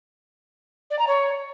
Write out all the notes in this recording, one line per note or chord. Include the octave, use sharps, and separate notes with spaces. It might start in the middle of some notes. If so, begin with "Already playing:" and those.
D5
A#5
C#5